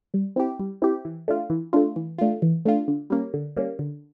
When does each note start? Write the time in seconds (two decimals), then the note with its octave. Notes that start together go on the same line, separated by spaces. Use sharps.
0.14 G3
0.36 C4 E4 G4
0.60 G3
0.82 C4 E4 G4
1.05 E3
1.28 A3 D4 F4
1.50 E3
1.73 A3 D4 F4
1.96 E3
2.19 A3 D4 F4
2.42 E3
2.65 A3 D4 F4
2.88 D3
3.10 G3 A#3 C#4
3.34 D3
3.57 G3 A#3 C#4
3.79 D3